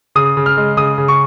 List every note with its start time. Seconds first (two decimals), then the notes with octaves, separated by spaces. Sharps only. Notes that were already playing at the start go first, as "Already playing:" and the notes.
0.15 C#3 D#6
0.37 C#3
0.46 F6
0.57 G#3
0.77 C#3 D#6
0.98 C#3
1.08 C#6